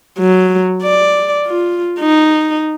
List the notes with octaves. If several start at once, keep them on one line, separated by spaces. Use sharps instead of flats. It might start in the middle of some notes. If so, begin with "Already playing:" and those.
F#3
D5
F4
D#4